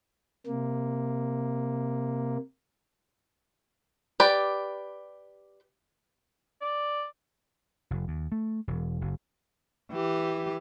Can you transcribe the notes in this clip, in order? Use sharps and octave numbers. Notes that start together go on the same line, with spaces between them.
C3 A#3
G4 B4 D5
D5
F1
D#2
A3
E1
F#1
E3 G4